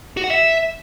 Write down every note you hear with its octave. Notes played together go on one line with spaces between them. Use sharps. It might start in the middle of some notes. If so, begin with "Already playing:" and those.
F#4
F#5
E5